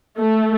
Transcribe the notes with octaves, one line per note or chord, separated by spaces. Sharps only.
A3